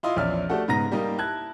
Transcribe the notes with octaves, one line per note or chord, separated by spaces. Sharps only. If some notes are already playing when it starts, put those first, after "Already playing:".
E4 F4 D#5 C6
A#1 E2 C#4 D5 E5 F6
A3 D4 F#4 G4 A4 F#5
G#2 C#3 B3 A#5 A#6
G3 A#3 D#4
E4 A5 F#6 G#6